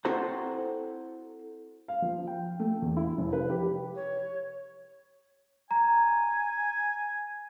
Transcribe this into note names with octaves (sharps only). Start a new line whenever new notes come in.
C4 E4 F#4 A4 C5 A#5
F5
F3
G5
A3
E2
E4
F1
B4
G4
C#5
G#5 A#5